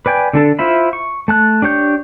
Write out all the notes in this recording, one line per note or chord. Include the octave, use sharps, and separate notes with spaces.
B4 D5 G5 G#5
D3 D4 A4
E4 F4 C5 E5 B5
C#6
A3 A5 F#6
D4 G4 C#5 G6